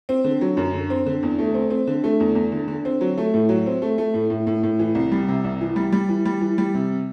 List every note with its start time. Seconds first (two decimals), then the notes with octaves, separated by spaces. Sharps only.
0.09 C4
0.24 D3
0.41 F#3
0.57 F#2
0.74 D3
0.90 C4
1.07 D3
1.23 E2
1.39 A3
1.54 C4
1.70 C4
1.87 D3
2.04 A3
2.20 E2
2.35 E2
2.52 D3
2.68 D3
2.85 C4
3.01 F#3
3.18 A3
3.34 A2
3.49 F#3
3.66 C4
3.82 A3
3.98 A3
4.14 A2
4.30 A2
4.47 A2
4.63 A2
4.79 E3
4.95 C2
5.12 G3
5.28 C3
5.44 C2
5.61 E3
5.76 G3
5.93 G3
6.09 E3
6.25 G3
6.41 E3
6.58 G3
6.74 C3